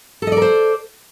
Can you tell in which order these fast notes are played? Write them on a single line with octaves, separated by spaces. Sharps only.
A4 D#5 D5 A#4 C5